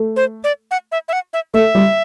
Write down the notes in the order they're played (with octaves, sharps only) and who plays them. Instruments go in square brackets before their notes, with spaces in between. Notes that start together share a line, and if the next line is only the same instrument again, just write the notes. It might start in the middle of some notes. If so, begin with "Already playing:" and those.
Already playing: [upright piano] A3
[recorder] C5
D5
F#5
E5
E5
F#5
E5
[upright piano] A3 [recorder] E5
[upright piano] G3